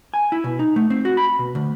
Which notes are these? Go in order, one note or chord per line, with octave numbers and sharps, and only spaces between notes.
G#5
E4
B2
D#4
A3
C4
F#4
B5
B2
D2